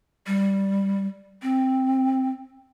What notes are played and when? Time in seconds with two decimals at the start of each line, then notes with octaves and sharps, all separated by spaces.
0.27 G3
1.42 C4